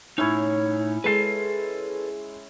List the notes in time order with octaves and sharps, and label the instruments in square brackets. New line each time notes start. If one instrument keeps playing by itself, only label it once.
[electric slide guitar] A2 D#4 [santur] C#4 E4 C#5
[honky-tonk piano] G#3 C7 [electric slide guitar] A4 B4